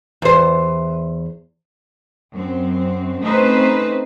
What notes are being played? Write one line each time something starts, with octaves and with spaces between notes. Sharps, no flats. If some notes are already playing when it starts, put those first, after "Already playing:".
E2 C5
F#2 C4
A3 C4 C#4 D#4 B4 C5